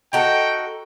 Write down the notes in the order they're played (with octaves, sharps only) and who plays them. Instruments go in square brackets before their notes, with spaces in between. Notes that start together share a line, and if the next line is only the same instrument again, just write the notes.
[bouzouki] D#4 F#4 A4 [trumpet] G5